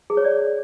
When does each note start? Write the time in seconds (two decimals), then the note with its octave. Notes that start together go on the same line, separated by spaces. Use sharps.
0.10 G#4
0.17 C#5
0.25 D5